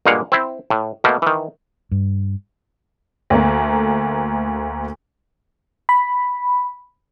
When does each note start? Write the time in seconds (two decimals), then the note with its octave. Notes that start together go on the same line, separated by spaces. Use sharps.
0.06 G2 A#2 G#3 A#3 F5 F#5
0.32 C4 E4
0.70 A2
1.04 B2 A3 A#3
1.22 D#3 E3
1.91 G2
3.30 D2 A3 A#3
5.89 B5